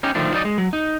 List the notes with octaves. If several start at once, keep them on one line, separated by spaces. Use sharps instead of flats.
C#4 D#4 G4
D3 D#3 F3 A3 D4
F#3 D#4 A4 D5 D#5
G#3
F#3
D#4